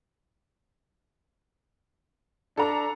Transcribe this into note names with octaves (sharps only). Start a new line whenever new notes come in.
D4 A4 A#5